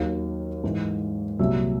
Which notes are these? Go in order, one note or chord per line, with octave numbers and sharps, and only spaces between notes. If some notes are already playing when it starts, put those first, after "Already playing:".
Already playing: D#2 D#3 F#3 F5
G#2 E3
C2 A#2 F#3 E5